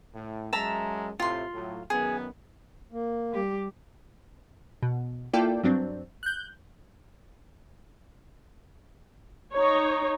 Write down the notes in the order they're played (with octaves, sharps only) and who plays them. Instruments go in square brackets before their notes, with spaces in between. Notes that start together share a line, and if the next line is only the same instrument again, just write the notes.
[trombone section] A2
[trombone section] F#2 F#3 G#3 [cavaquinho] E5 A5 A#5
[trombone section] A2 C3 [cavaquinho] F4 C6
[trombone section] A2 F#3
[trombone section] F#2 D#3 B3 [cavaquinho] G#4
[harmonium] A#3
[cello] G3 G4
[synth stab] B2
A#3 E4 F4 A4 D5 G5
G2 F#3 C4 D4
F#6 G6
[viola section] D#4 C#5